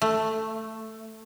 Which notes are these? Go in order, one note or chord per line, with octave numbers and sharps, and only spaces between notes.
A3